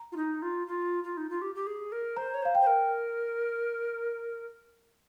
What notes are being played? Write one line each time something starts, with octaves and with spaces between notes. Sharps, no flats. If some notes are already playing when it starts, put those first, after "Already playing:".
Already playing: A#5
F4
D#4
F4
F4
F4
D#4
F4
G4
G4
G#4
A#4
C5 A#5
C#5
C5 F5
G5
C5
A#4